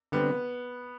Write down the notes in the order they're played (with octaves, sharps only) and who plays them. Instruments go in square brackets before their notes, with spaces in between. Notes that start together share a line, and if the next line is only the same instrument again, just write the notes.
[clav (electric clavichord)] D3 G3 C4 [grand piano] B3